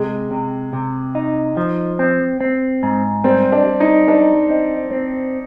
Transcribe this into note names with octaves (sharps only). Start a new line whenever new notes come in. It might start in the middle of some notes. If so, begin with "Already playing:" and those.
Already playing: C3 G#3
C3
C3
D#4
F3
C4
C4
G#2
G3 C4
D4
G3
D#4
D4 D#4
C4
C4